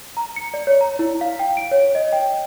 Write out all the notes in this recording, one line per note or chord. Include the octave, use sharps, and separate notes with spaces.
A#5
C#7
D5
C#5
A#5
E4
F5
G5
D7
C#5
D#5
G5